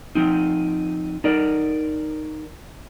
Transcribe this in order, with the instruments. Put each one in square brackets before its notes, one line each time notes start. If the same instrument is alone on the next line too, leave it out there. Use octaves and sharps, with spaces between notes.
[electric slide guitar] F3 C4 D#4
D#4 A#4 D5